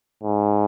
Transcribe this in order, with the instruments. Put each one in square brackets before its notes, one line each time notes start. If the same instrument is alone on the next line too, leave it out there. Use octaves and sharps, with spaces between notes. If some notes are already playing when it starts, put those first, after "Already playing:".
[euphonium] G#2